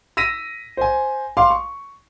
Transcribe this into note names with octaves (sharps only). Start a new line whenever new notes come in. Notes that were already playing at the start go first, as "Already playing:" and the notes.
E6 A#6 B6 D#7
C5 G#5
F5 C6 D6
C#6